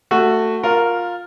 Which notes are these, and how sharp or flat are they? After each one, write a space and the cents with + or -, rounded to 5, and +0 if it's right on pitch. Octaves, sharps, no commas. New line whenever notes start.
A3 +15 F#4 +0
F4 +15 A#4 +0